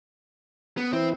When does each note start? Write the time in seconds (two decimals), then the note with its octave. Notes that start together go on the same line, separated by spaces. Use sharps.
0.77 B3
0.93 E3 C4 E4